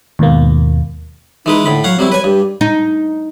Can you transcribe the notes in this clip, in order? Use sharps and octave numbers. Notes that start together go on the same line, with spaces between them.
D#2 G#2 B2 A#3
E3 G#3 D#4 B4
A2 D3 B5
F#3 C#5 F5 F#5
F#3 G3 C4 E4
B4 C#5 G#5
G2 G4
D#4